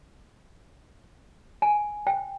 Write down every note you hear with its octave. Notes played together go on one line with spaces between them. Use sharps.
G#5
G5